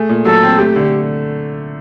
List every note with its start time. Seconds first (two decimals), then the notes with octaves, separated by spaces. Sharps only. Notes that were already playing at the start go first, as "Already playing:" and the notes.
Already playing: A3 G#4
0.09 A#2
0.25 F#3 A4
0.43 C4
0.58 A3 G4
0.76 D3